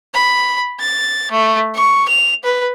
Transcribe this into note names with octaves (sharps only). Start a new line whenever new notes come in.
B5
A6
A3
C#6
F7
B4